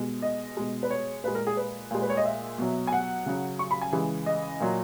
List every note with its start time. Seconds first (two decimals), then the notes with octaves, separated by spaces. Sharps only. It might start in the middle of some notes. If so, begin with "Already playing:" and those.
Already playing: B2 G#3
0.22 D#5
0.57 B2 G#3
0.83 B4
0.90 C#5
1.24 A#2 B4
1.27 G#3
1.35 A#4
1.47 G#4
1.57 B4
1.91 A#2 G#3
2.02 B4
2.10 C#5
2.17 D#5
2.25 E5
2.58 B2 F#3
2.87 G#5
2.92 F#5
3.26 C#3 F#3
3.59 C#6
3.71 B5
3.81 G#5
3.92 C#3 E3 G#3
4.26 D#5
4.60 A#2 F#3